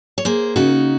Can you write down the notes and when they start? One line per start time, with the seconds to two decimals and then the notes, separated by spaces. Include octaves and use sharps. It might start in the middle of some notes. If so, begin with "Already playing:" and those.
0.18 C#5
0.25 A#3 G#4 C5
0.56 C#3 D#4 F#4